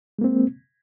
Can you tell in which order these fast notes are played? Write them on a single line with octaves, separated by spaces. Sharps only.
G#3 A#3 C4